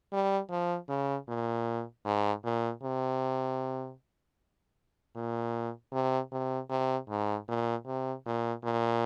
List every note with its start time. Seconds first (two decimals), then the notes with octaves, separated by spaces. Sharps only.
0.12 G3
0.50 F3
0.89 C#3
1.28 A#2
2.05 G#2
2.44 A#2
2.83 C3
5.15 A#2
5.92 C3
6.32 C3
6.70 C3
7.09 G#2
7.48 A#2
7.86 C3
8.26 A#2
8.64 A#2